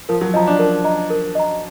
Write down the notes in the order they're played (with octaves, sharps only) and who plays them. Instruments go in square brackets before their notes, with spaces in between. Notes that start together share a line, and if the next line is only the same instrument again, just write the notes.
[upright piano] F3 [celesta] A#4
[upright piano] F#3
[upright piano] F3 [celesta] D#5
[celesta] A#5
[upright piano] D4
[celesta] A#4
D#5 A#5
A#4
D#5 A#5